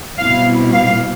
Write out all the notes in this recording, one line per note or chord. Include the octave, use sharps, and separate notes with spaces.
B2 G3 C4 E4 F5
F5